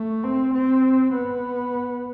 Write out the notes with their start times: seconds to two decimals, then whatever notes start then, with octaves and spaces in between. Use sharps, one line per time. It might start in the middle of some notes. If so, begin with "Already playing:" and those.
Already playing: A3
0.24 C4
0.54 C4
1.15 B3